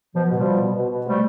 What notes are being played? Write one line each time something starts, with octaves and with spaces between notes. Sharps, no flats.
B2 F3
B2
F3 G3
B2
B2
B2
B2
C3 G3 A3